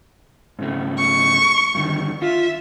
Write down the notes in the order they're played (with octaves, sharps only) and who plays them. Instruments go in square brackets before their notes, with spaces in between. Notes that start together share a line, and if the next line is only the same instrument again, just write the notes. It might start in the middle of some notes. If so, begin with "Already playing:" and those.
[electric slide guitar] G#2 C#3 A3
[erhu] C#6
[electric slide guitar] G2 D3 D#3
[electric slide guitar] F4 [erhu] E5